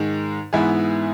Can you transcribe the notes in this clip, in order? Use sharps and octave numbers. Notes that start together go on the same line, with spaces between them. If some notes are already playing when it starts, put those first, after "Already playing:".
Already playing: G#2 D#3 G#3
G#2 E3 B3 E4 G#4